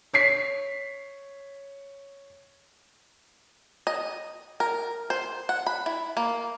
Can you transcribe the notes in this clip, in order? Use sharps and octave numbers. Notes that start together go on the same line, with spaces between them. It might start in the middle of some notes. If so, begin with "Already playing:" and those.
C#5 B6 C7
D#5
A#4
C5
F#5
B5
E4
A#3